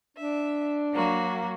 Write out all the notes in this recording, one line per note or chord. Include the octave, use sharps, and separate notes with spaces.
D4 E5
F#3 A#3 F#4